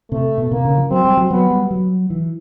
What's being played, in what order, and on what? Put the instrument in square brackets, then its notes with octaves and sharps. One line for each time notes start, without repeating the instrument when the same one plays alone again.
[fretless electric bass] C3 [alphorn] A3
[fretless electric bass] B2
[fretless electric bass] C3 [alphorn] A#3
[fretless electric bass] C#3
F3
[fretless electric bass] F#3 [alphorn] C4
[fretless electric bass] G3
F#3
[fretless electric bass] F#3 [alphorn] B3
[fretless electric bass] G3
F#3
E3